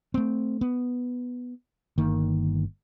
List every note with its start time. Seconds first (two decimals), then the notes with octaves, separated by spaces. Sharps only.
0.14 A3 C4
0.61 B3
1.98 G1 D#3 A#3